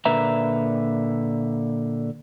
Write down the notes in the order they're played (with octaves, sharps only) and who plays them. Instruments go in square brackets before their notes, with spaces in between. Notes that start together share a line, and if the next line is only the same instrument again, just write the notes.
[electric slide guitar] A#2 D3 A#4 B4 E5 A#5